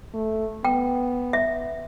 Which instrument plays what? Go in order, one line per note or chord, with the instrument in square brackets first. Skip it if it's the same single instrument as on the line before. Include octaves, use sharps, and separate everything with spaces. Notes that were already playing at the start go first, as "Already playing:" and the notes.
[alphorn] A3
[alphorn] B3 [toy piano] G5
[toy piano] E5